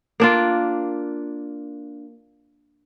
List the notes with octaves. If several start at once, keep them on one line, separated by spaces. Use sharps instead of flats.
A#3 D4 F4